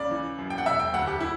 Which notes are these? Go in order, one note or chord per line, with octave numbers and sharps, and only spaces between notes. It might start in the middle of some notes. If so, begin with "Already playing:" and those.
Already playing: C#2 C#3 D5
E3
F#2
G5
F#5
E1 E5
G5
D2 F#5
G4
E4